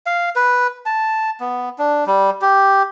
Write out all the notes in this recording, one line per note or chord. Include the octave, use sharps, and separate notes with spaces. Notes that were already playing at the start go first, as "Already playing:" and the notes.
F5
B4
A5
B3
D4
G3
G4